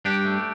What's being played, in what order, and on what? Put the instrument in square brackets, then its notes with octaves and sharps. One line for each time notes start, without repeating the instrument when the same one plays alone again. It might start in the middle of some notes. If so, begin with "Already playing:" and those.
[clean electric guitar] G2 D4 G4
A3